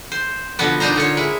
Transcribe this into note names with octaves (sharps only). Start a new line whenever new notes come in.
C5
B2 D3 F3 B3
A#2 D4 D#4 C5 A#5
D3 F4 C#5
G#3 E4